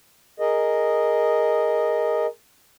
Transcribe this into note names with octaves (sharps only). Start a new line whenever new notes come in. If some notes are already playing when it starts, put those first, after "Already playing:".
G#4 A#4 D#5